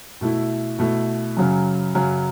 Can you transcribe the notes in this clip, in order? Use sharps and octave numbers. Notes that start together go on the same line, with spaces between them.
B2 A3 E4
B2 A3 E4
F#2 C#3 F#3
F#2 C#3 F#3